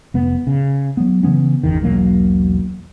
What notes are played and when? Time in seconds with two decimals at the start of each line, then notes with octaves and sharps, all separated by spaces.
0.14 F1 B3
0.47 C#3
0.97 F#3 B3
1.23 C#3 E3 B3 C#4
1.63 G1 E2 D#3
1.81 E1 B1 F#3 A#3